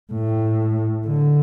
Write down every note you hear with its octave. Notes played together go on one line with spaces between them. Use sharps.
A2
D3